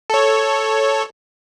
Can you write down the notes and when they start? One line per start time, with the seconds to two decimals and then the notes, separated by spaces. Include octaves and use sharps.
0.10 A4 C#5